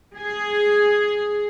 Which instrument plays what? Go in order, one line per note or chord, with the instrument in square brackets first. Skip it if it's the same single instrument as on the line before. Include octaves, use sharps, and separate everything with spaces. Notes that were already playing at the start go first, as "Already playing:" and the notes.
[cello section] G#4